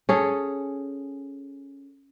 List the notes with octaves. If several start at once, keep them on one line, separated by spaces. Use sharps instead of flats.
C#4 G#4 A4